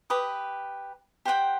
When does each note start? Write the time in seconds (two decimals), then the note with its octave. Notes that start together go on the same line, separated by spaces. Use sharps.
0.10 G4 B4 D#6
1.25 G4 C5 F#5 G5